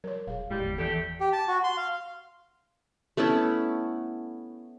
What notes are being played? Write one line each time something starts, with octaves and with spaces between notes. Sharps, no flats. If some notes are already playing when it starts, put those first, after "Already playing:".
F#3 A#4 C#5
D#1 G#4 F5
A2 G3 G#3
G1 E2
E3 A3 E4 G4 A4
G4
A5
F#4
C6
F5
A3 B3 C#4 E4